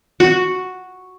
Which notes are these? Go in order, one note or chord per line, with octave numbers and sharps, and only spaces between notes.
F#4